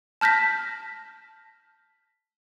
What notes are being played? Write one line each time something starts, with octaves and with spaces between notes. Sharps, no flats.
A5 F6 G6 A#6 B6